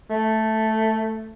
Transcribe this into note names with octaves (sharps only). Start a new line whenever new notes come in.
A3